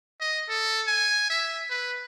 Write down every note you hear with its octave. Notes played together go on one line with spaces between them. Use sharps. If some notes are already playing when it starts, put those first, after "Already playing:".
D#5
A4
G#5
E5
B4